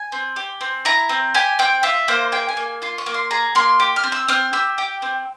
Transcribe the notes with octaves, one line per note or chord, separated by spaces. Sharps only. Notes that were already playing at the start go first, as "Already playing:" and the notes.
Already playing: G#5
C4
G4
C4
E4 A#5
C4
G4 G#5
C4 G5
F4 E5
A#3 C5
G#4 G5
G#5
A#3
F4 C6
C#6
A#3
C6
G#4 A#5
A#3 C6
G4
F6
C4
E6
C4 F6
G4 E6
G4 G5
C4